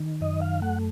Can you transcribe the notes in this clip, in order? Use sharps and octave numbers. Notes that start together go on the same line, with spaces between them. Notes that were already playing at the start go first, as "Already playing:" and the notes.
Already playing: D#3
F#2 D#5
F5
A3 F#5